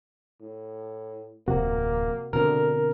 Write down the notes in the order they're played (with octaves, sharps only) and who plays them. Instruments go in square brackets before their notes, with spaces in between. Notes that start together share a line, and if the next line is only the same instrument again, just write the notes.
[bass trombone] A2
[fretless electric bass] D1 F2 [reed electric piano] C3 F#4 [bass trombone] A#3
[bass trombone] D2 [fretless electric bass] B2 D3 C4 [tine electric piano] A#4